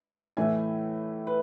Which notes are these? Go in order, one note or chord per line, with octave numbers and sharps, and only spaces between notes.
A2 E3 A3 G#5
B4